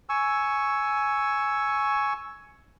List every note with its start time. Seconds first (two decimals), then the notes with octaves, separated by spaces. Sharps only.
0.09 G#5 C#6 E6